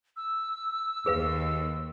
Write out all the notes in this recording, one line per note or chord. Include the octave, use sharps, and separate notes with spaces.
E6
D#2 G#4 B4 F5